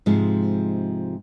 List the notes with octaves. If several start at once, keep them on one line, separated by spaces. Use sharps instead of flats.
G#2 C3 F3 G#3